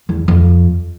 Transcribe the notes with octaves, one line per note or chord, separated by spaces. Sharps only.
E2
F2